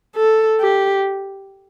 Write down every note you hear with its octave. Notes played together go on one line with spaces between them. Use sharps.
A4
G4